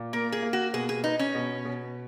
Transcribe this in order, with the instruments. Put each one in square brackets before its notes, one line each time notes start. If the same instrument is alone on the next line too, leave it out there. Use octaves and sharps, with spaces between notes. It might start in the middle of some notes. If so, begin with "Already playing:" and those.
Already playing: [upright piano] A#2
[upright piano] A#3 [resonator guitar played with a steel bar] A#4
[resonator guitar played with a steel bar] G#4
[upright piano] A#3
[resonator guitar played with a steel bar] F#4
[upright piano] B2 [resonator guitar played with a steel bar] G#4
[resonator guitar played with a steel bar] G#4
[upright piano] B3 [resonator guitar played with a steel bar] D#4
[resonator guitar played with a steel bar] C#4
[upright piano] B2
B2